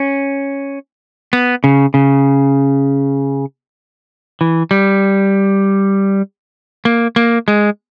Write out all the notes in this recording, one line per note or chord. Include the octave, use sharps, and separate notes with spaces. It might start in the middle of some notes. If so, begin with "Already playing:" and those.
Already playing: C#4
B3
C#3
C#3
E3
G3
A#3
A#3
G#3